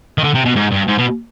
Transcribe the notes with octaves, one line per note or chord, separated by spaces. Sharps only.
D#3
D3
C3
B2
G#2
G2
G#2
B2